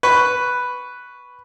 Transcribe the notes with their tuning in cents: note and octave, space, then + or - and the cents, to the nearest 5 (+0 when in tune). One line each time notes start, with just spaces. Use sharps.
B4 +0 C#6 +0